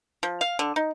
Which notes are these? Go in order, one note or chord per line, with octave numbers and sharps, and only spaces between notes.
F3
F5
D3
D#4